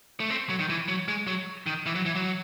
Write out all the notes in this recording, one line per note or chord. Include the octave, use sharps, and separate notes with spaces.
A3
C4
F#3
D#3
E3
F#3
G#3
F#3
D#3
E3
F#3
E3
F#3